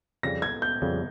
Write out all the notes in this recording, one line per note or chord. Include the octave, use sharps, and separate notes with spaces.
F2 C#3 G3 A#6
G#6
G6
F2 C#3 G3